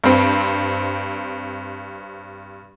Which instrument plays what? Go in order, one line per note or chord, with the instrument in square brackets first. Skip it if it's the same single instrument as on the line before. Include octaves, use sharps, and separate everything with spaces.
[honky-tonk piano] G2 C4